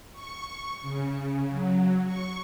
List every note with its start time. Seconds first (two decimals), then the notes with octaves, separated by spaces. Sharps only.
0.12 C#6
0.81 C#3
1.48 F#3
2.05 C#6